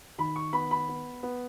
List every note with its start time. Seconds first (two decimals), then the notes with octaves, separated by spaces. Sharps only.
0.18 D#3 B5
0.36 C#6
0.53 B3 B5
0.71 B5
0.88 B3
1.23 B3